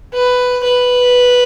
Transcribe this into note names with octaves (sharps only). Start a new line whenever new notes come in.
B4
B4